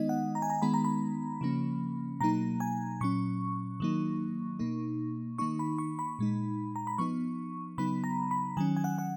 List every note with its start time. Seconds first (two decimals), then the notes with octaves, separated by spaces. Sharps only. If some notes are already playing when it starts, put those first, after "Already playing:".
Already playing: D#3 G#3 B3 D#4 D#5
0.09 F#5
0.35 A#5
0.42 G#5
0.50 A#5
0.62 D#3 G#3 B3 D#4 B5
0.74 A#5
0.84 B5
1.41 C#3 F3 A#3 C#4
2.20 B2 F#3 A#3 D#4 A#5
2.60 G#5
3.01 A#2 F#3 C#4 C#6
3.80 D#3 F#3 A#3 D#4
4.59 B2 A#3 D#4
5.38 D#3 A#3 D#4 C#6
5.59 B5
5.78 C#6
5.99 B5
6.19 A#2 G#3 D#4
6.76 A#5
6.87 B5
6.98 F3 B3 D#4 C#6
7.78 C#3 F#3 B3 D#4 B5
8.04 A#5
8.31 B5
8.57 D#3 F#3 C#4 G#5
8.77 G#5
8.84 F#5
8.98 F#5